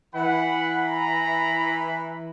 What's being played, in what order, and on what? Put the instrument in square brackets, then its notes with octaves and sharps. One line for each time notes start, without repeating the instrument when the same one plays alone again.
[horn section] E3 B5 [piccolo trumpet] F#5
[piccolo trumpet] A#5